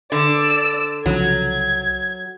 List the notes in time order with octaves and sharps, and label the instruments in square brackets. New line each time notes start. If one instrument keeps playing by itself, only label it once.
[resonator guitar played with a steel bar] D3 [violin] D5 E6
[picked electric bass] C2 C#3 F3 [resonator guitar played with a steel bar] F#3 [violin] G#6